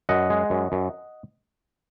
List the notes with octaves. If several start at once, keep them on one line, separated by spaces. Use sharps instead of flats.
F#2 D#5 F#5
G#3
F#2
F#2